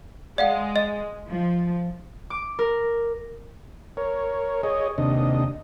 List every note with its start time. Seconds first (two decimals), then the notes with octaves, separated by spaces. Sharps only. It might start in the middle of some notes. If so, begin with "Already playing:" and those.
0.38 G#3 D5 F5 F#5
0.76 D#5
1.27 F3
2.30 D6
2.59 A#4
3.97 A#4 C#5
4.63 G#4 C#5 D#5
4.98 D#2 C3 D4 D#5